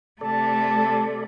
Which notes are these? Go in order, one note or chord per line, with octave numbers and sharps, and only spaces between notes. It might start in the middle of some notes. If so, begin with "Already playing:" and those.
C3 A3 A4 D5 A5